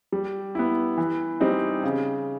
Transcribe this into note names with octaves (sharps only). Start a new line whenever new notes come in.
G3
B3 E4
E3
G3 C4 D#4
C#3